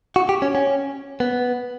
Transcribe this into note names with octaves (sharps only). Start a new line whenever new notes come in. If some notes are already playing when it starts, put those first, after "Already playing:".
F#4
G4
C#4
C#4
B3